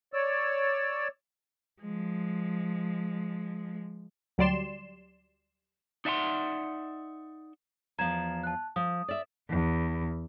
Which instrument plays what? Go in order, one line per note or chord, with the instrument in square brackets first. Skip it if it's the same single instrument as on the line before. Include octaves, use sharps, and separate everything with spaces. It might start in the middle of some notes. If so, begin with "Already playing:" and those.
[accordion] C#5 D5 E6
[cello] F3 G#3
[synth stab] D2 F#3 G3 D5 C6 E7
[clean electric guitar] D#4 D5 E5 F#5 G#5 C6
[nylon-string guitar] E2 F3 [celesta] A#5 G#6 E7
[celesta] A5 F#6
[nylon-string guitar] F3 [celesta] D#6
[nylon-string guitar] D5 E5
[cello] E2